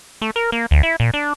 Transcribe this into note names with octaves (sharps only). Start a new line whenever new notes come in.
A3
A#4
A#3
D2
E4
A#2
D4